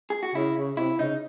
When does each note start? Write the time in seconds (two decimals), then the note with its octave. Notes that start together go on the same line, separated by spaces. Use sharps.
0.10 G#4
0.23 F#4
0.35 C#3 E4
0.56 C#3
0.77 C3 E4
0.99 C#3 D#4